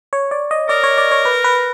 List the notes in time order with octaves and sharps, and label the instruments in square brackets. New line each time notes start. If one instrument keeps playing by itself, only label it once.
[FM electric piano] C#5
D5
D#5
[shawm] A#4 [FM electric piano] D5
[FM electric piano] C#5
D5
C#5
B4
B4